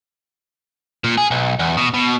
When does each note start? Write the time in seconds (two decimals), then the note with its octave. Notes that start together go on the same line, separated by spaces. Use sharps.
1.04 A#2
1.18 G#4
1.31 B1
1.59 E2
1.77 B2
1.94 B2